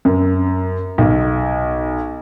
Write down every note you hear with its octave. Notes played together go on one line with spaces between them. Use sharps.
F#2
B1